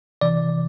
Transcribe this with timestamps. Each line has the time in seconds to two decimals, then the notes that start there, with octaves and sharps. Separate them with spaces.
0.21 C3 E3 D5